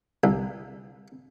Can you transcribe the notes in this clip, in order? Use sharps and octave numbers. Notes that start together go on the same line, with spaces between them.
C2